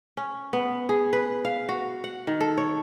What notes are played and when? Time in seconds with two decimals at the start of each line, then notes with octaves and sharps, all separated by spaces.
0.17 C#4
0.53 B3
0.89 G#4
1.13 B4
1.45 F5
1.69 F#4
2.04 F#5
2.27 D#3
2.40 A4
2.57 C#5